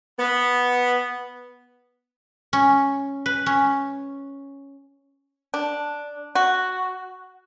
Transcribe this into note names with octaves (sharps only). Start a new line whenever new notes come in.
B3
C#4
B4
C#4
D4
F#4